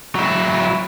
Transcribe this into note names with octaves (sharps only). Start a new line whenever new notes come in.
F#3 E4